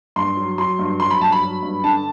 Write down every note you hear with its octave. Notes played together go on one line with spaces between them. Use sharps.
G2 C6
F#3
F#3 C6
G2
F#3 C6
B5
G2 A5
B5
F#3
G2
D3 A5